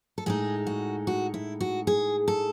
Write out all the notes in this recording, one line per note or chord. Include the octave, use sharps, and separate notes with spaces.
A4
A2 G#3 D#4 G#4
F#4
F#4
E4
F#4
G#4
A4